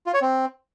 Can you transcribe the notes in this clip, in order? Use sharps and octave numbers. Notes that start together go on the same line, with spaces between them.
F4
C#5
C4